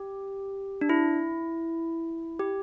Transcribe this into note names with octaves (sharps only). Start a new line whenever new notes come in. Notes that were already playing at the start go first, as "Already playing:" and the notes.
Already playing: G4
D4
E4
G4